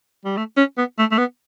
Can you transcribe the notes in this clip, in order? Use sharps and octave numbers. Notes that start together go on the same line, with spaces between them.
G3
A3
C#4
B3
A3
A3
B3